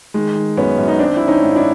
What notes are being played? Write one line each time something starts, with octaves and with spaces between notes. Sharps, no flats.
D#3 G#3
D#3
F#2 B3 C#4
F#2
D#4
D#3 C4 D4
D#3 E4
C#4 D#4
G#2
D4 E4